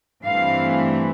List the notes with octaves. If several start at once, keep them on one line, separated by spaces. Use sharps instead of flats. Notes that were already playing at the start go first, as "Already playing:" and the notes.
G2 E3 A3 C4 F5